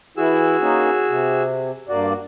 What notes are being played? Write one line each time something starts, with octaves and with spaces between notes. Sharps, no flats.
E3 E4 F#4 G#4 E6
A#3 C#4 D#4
C3
G2 A#3 F#4 D5